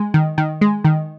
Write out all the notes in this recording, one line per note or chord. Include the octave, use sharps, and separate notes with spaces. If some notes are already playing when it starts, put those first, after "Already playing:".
Already playing: G#3
D#3
D#3
G#3
D#3